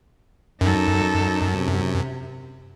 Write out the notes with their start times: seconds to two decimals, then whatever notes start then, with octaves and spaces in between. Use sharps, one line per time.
0.61 F#2 D#4 A4
1.56 C3